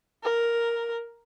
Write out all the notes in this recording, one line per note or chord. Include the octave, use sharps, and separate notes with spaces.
A#4